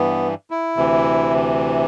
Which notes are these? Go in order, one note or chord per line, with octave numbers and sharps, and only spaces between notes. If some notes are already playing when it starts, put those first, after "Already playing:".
Already playing: G2 E3 B3
E4
D2 C3 E3